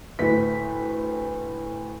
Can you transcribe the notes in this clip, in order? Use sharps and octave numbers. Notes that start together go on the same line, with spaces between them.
D2 A2 B4 B6